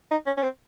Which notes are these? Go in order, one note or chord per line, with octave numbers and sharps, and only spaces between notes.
D#4
C#4
C#4
C4